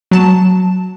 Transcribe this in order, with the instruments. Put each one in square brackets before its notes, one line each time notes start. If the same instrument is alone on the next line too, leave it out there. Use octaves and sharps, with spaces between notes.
[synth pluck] F#3 A5 E7